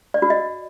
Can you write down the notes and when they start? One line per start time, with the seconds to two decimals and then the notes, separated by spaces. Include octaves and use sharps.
0.14 D5
0.22 F#4
0.30 D#5